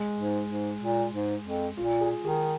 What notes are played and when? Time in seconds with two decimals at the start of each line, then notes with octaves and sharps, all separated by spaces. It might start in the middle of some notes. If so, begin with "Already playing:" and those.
Already playing: G#3
0.19 G#2
0.50 G#2
0.83 A#2
1.13 G#2
1.46 F2
1.77 A#2 F4
2.01 G#4
2.24 D#3 G#4